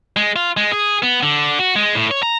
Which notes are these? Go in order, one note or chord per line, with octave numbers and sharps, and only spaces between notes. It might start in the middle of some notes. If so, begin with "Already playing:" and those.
G#3
F4
G#3
G#4
B3
D3
F#4
G#3
A2
C#5
A#5